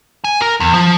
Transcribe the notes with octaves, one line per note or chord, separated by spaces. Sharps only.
G#5
A#4
E2
F3